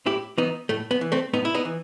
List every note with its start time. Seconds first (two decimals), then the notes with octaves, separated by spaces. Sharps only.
0.06 A2 E4 G4
0.38 E3 B3 D#4
0.69 A2 A3
0.91 B3
1.01 E3
1.12 A3 C4
1.33 A2 B3 D#4
1.45 E4
1.54 B3 D#4
1.65 E3